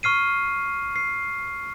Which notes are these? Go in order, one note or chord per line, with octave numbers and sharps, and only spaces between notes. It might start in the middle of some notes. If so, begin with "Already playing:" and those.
C#6 F6 C7 D#7
C7